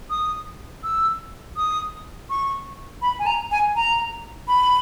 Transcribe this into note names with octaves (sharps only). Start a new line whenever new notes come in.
D#6
E6
D#6
C#6
B5
G#5
A#5
G#5
A#5
B5